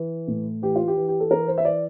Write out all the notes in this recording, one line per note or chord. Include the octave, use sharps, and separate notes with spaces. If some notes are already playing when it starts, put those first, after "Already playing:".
Already playing: E3
A2
E3 G4
F4
G4
E3
G4
A4
E3 A#4
C5
E5
E3 D5